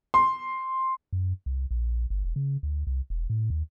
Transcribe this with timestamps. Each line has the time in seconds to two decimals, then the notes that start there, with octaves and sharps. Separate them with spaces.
0.14 C6
1.13 F#2
1.46 C2
1.71 A#1
2.10 G1
2.25 E1
2.36 C#3
2.63 D2
2.87 C2
3.10 E1
3.30 A2
3.50 D#2